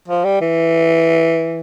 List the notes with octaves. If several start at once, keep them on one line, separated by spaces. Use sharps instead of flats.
F3
G3
E3